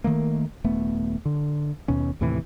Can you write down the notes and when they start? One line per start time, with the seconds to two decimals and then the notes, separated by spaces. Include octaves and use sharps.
0.04 D#3 A3 A#3
0.64 D#1 A3 B3
1.25 D3
1.88 D#2 B2 C#4
2.21 D#2 A2 C3 E3